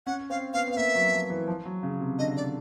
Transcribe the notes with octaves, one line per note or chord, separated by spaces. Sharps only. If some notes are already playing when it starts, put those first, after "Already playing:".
C#4 F#5
C4 F5
B3 F5
B3 F5
A#3 E5
F#3
F3
E3
F3
F#3
C#3
C3
D3 D#5
D5